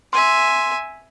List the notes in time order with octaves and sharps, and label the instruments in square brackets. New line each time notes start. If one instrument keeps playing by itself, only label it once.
[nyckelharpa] E5 G#5 [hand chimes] C6